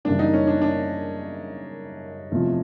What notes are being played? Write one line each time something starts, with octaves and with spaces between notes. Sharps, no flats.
F#2 C#3 E3 G3 A#3 D4
D#4
C#4
D4
D4
E2 C3 F3 A3